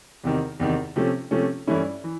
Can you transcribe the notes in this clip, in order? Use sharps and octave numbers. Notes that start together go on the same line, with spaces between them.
E2 C3 D#3
E2 C3 D#3
C3 F3 A3 C#4
C3 F3 A3 C#4
G2 E3 A3 C#4 E4
E3